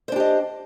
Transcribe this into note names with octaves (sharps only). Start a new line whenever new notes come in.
D4 G4 C5 D#5